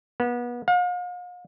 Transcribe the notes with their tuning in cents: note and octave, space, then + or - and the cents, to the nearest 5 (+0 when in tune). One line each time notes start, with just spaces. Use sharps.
B3 -30
F5 +40